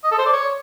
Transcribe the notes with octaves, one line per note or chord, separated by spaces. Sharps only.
D#5
A4
C5
D5
C#5